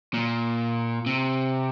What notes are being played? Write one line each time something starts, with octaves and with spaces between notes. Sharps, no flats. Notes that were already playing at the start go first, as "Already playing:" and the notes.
A#2
C3